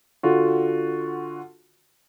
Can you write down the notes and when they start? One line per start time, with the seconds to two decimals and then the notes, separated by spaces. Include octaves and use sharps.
0.23 D3 F4 F#4